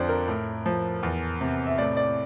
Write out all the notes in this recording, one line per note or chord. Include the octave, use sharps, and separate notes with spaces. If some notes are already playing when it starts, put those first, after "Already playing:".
Already playing: F2 D3 C5 D5
A#4
A2
F3
E2
C3
E5
A2 D5
D5